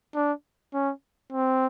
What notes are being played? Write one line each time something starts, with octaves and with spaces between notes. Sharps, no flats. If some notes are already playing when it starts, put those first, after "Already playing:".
D4
C#4
C4